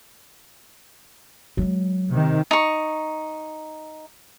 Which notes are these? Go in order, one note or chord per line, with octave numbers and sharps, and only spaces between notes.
F#3 G#3
C3 D#3
D#4 C#6